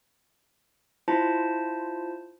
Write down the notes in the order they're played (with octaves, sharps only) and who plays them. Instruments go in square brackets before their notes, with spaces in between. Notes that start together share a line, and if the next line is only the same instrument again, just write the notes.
[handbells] E4 F4 C5 A5